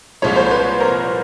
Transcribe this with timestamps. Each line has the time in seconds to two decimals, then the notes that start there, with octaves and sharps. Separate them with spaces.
0.22 C2 A#2 F3 G#3 C#5
0.36 C5
0.46 C5
0.51 B4
0.81 A#4